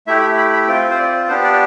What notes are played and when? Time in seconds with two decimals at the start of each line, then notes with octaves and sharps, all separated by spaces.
0.07 A3 E4 G4 E5
0.21 B5
0.37 B5
0.53 B5
0.68 C4 F4 G5
0.91 C5
0.99 D5
1.28 B3 D4 G4 C5
1.44 D5